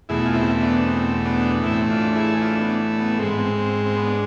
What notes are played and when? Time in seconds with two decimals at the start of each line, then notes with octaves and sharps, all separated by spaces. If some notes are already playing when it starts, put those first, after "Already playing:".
0.09 E2 B2 A3 E4 G#4
0.26 F4
0.34 C4 E4
0.60 B3 D4
0.86 C4
1.25 B3 D4
1.63 A2 E3 A3 C4 E4
1.90 D4 F4
2.16 E4 G#4
2.41 D4 F4
2.61 B3 D4
2.99 B3
3.19 G#2 G#3 C4
3.30 B3
3.39 C4
3.58 C4
3.85 C4
3.96 B3
4.07 D4